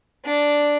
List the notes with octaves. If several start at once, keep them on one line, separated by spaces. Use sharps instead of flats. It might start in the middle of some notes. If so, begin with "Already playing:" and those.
D4